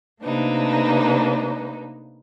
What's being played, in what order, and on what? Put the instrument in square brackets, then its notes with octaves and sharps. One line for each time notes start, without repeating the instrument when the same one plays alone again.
[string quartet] C3 A3 A#3 D4 D#4 B4